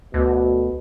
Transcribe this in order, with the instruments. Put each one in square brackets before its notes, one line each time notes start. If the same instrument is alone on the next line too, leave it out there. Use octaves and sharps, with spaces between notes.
[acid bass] D2 [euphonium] B2